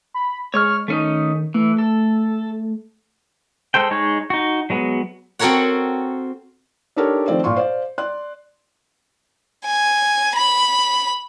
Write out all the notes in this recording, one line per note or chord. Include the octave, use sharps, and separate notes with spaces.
B5
G#3 C#5 C#6 F6
D#3 A3 C#4 D#4
E3 A3
A4
G#3 A4 C5 G5
G#3 D#4 C#5
D#4 F#4
F#3 G#3 B3
C4 F#4 A4 A#4 C#5 F#5
D4 D#4 G4 A4 A#4 C#5
D#3 F3 A3 C4 D5
A#2 F4 C6 C#6
C5 D5 F5
D5 C6 F#6
G#5
B5